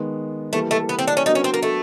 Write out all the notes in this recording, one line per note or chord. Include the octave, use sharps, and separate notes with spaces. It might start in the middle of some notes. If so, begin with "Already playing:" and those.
Already playing: D#3 G#3 B3
E3 G3 A3 A#3
A3
B3
C4
D4
C#4
F#3 B3 D4 D#4 F#4 A#4
C#4
C4
A#3
A3